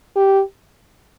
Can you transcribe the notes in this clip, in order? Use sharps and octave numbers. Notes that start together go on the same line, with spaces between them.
G4